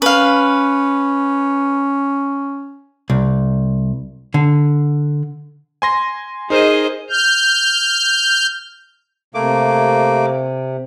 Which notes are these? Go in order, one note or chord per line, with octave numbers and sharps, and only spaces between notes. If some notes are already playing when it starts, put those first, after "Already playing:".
C#4 B4 F5
C2
D3
G#5 C6 A#6
D#4 G#4 A#4 C5 D#5
F6 G6
C3 A3 A#3 D6